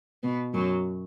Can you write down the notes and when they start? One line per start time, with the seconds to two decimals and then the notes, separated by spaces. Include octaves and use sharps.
0.23 B2 B3
0.54 F#2 F#3